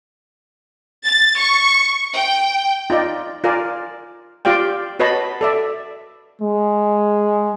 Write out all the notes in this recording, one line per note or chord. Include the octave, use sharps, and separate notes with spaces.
A6
C#6
G5
D#4 F4 D5 D#5
F4 A#4 D5 G#5
F4 G4 D5 F5 G5
F#4 B4 C#5 D#5 A5 B5
A4 D5 E5
G#3